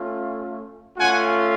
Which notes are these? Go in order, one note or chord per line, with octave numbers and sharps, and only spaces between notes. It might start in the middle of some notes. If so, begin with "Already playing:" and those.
Already playing: A3 C#4 F4
A3 C#4 F4 F#5 G#5